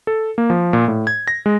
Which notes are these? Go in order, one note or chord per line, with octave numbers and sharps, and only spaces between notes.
A4
A#3
F3
A#2
A2
G#6
A#6
G#3